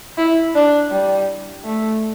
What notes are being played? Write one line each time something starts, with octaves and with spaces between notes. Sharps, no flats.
E4
D4
G3
A3